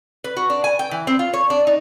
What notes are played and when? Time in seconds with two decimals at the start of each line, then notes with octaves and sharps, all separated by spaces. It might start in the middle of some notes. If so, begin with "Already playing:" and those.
0.24 B4
0.37 F#4
0.50 D4
0.64 G#5
0.79 G5
0.91 E3
1.07 C4
1.19 F4
1.33 C#5
1.50 D4
1.67 D#4